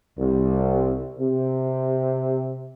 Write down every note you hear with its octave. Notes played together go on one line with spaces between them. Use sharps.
C2
C3